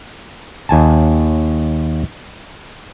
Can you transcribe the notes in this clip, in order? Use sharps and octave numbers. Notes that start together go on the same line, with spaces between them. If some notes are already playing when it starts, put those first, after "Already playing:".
D#2 G#5 A5